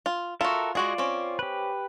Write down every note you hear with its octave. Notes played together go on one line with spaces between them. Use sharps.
F4
F4 F#4 A4 A#4 E5
G#3 F4 F#4 G#4 D5
C4 C#4
G4 B4